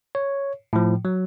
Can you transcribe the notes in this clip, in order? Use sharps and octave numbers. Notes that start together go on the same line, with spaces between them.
C#5
A2 F3
F#3